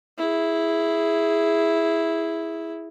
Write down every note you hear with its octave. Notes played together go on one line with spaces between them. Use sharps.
E4 G#4